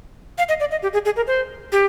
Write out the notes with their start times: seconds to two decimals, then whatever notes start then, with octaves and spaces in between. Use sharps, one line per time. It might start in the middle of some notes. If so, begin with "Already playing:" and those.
0.38 F5
0.49 D#5
0.60 D5
0.71 D#5
0.83 G4
0.93 G#4
1.05 G#4
1.16 A#4
1.27 C5
1.72 G4